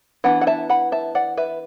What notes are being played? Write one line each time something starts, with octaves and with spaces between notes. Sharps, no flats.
E3 B3 D4 F#5
F#5
E5 A5
F#5 B5
E5 A5
D5 F#5
B4 E5